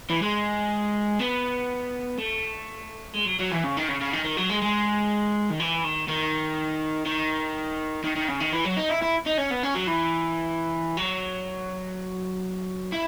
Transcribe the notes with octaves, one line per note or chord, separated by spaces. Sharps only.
E3
G#3
B3
A3
G#3
F#3
F#3
E3
C#3
D#3
C#3
C#3
D#3
D#3
F#3
G#3
G#3
D#3
E3
D#3
D#3
D#3
D#3
D#3
C#3
D#3
E3
F#3
D#4
E4
E4
D#4
C#4
B3
C#4
F#3
E3
F#3
E4